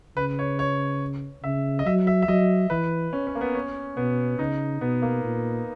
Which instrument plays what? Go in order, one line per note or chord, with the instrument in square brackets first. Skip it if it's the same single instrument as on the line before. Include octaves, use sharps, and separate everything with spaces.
[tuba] C#3 [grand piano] B4
[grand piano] C#5
C#5
[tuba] C#3 [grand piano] E5
[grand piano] D#5
[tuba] F#3 [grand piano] E5
[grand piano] E5
E5
[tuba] F#3 [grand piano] D#5
[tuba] E3 [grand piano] B4
[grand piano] C#4
C#4
A#3
B3
C#4
[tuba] B2 [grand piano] B3
[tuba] C#3 [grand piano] D#4
[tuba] B2 [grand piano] B3
[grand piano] A#3
[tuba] A#2